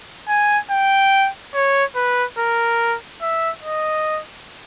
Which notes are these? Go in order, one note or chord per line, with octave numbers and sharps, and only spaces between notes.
G#5
G5
C#5
B4
A#4
E5
D#5